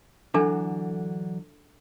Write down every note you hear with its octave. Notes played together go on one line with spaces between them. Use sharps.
D3 E3 F#3 D4 A4 G#5